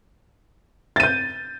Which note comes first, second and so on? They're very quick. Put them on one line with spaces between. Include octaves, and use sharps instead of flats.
A6 D#7 G6